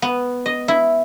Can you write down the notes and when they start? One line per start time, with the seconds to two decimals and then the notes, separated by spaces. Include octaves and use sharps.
0.02 B3
0.46 D#5
0.68 E4